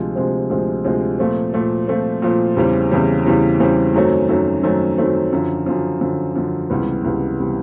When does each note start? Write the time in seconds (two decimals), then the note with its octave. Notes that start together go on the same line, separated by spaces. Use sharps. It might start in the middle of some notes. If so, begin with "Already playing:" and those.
Already playing: D2 C3 F3 G#3 C4
0.15 D2 C3 F3 G#3 C4
0.50 D2 C3 F3 G#3 C4
0.85 D2 C3 F3 G#3 C4
1.19 A#2 F3 A3 C4
1.54 A#2 F3 A3 C4
1.88 A#2 F3 A3 C4
2.22 A#2 F3 A3 C4
2.57 E2 C#3 E3 G3 C4
2.91 E2 C#3 E3 G3 C4
3.25 E2 C#3 E3 G3 C4
3.60 E2 C#3 E3 G3 C4
3.94 F#2 D#3 F#3 A3 C4
4.29 F#2 D#3 F#3 A3 C4
4.63 F#2 D#3 F#3 A3 C4
4.98 F#2 D#3 F#3 A3 C4
5.32 F#2 D3 F3
5.66 F#2 D3 F3
6.01 F#2 D3 F3
6.35 F#2 D3 F3
6.70 C#2 C3 E3 G3 B3
7.05 C#2 C3 E3 G3 B3
7.39 C3 E3 G3 B3